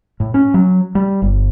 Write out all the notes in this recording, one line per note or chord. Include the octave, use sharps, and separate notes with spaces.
A2
C#4
F#3
G3
G1